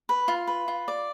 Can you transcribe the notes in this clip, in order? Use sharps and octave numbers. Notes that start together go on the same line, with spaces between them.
B4
F4
B4
F4
D5